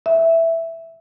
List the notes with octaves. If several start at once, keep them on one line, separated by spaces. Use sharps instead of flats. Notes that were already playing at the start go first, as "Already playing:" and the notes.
E5